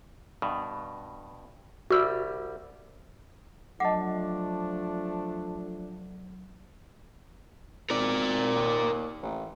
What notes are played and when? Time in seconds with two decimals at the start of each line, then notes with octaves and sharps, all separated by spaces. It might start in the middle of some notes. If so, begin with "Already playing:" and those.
0.42 G2 B2
1.90 C2 G3 F#4 E6
3.80 F3 F#3 A3 D4 D#5 F#5 A5 D6
7.90 G#1 A#4 D5
8.55 D#2
9.23 A1